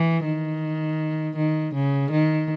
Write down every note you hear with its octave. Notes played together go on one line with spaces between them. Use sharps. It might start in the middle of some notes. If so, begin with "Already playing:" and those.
Already playing: E3
D#3
D#3
C#3
D#3